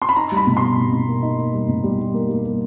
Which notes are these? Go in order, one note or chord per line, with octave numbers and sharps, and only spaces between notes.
C6
B5
D#4 A#5
G3
B5
B2
D#4 C6
B2
B2
A#3
D#4
A#3
G3
B2
G3
D#4
A#3
G3
A#3